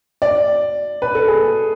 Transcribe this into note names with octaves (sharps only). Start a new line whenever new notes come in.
D5
B4
A4
G#4